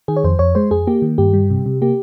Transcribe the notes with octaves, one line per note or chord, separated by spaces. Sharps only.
D#3 G#4
C#5
F2 C5
F2 C#5
G#3 C5
F2 G#4
A#3 G4
D#3
G2 G4
G3
C3
C3
A#3 G4